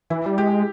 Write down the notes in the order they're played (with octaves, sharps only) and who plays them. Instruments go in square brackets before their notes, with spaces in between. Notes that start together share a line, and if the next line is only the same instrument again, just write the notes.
[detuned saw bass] E3 [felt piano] E4
[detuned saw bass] G3
[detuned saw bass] G#3 [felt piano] G4